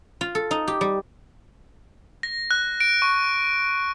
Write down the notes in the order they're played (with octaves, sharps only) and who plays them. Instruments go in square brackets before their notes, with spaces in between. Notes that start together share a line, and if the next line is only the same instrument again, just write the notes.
[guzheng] F4
A4
D#4
G4
G3
[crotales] A#6
F#6
D7
C#6